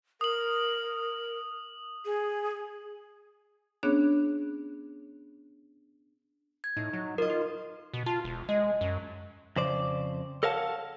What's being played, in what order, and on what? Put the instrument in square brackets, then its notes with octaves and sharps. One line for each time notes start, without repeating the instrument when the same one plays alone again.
[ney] A#4 [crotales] D#6 F#7
[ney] G#4
[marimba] B3 C#4 D4 G#4 C#5 F#6
[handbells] G#6
[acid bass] A2 [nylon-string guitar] D#4
[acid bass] F#3
[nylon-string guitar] D#4 D#5 [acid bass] F4 [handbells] A#4
[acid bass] F4
B2
[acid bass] F4 [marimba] A5
[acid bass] E1
[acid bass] G#3 [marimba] D#5
[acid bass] F#2
[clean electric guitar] F2 C#3 C5 D5
A4 A#4 C#5 F5 F#5 A5